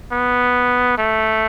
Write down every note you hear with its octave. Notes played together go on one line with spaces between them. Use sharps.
B3
A3